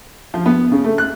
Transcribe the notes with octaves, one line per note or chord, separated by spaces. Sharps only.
F3
B3
C#3
A3
F#6